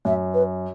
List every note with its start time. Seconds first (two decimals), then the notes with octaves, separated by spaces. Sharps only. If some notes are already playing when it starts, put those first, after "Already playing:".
0.05 F#2 E5
0.34 B4